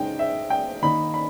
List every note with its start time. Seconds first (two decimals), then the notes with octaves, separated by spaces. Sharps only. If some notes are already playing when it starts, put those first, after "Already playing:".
Already playing: C#3 G#3 D#4 G5
0.19 E5
0.50 G5
0.82 D#3 A#3 D#4 B5
1.14 B5